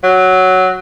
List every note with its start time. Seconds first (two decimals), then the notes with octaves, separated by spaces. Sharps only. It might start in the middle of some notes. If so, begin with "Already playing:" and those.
0.04 F#3